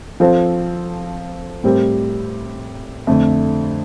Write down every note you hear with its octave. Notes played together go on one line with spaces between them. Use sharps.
F3 C4 F4 A4 C5
A2 G3 C4 G4 A#4
F2 D3 A3